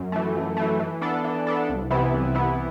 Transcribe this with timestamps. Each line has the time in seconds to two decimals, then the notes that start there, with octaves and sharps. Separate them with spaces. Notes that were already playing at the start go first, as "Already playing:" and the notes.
Already playing: F#2
0.12 E3 A3
0.35 F#2
0.57 E3 A3
0.80 E3
1.01 B3 D4 A4
1.24 E3
1.47 B3 D4 A4
1.69 C2
1.90 C3 E3 B3 E4
2.13 C2
2.35 C3 E3 B3 E4